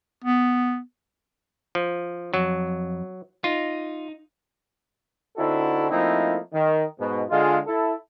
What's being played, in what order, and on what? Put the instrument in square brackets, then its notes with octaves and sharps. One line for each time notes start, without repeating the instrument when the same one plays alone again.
[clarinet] B3
[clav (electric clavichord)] F3
[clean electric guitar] F2 [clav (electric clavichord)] F#3
[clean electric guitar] D#4 [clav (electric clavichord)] F4
[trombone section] D3 C4 D#4 E4 F#4 A4
F3 A3 A#3 C4 D#4 E4
D#3
G#2 B2
D3 G#3 F4
E4 A4